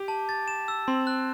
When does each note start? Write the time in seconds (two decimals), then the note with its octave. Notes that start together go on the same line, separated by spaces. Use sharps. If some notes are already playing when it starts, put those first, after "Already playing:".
Already playing: G4
0.08 A5
0.29 A6
0.48 E7
0.68 E6
0.88 C4 C6
1.07 F#6